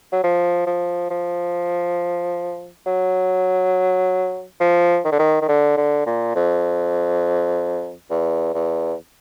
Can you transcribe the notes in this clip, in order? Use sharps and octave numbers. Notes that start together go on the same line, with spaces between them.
F#3
F3
F3
F3
F#3
F3
D#3
D3
D#3
D#3
D3
D3
A#2
F2
E2
E2